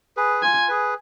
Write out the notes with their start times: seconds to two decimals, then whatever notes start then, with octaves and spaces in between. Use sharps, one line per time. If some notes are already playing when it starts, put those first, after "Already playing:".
0.17 G#4 B4
0.43 F4 G#5
0.68 G#4 B4